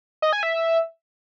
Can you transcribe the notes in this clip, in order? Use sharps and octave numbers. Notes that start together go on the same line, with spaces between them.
D#5
G#5
E5